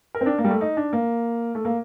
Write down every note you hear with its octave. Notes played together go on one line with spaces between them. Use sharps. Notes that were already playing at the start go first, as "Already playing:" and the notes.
A#4
C4
D4
A#3
G3
A3
D#4
D4
A#3
A3
A#3